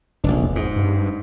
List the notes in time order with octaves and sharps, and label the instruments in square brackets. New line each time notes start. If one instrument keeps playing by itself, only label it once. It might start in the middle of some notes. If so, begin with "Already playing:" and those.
[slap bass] F1 A#1 [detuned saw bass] D4
[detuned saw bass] E1
[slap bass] G#2
[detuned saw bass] G2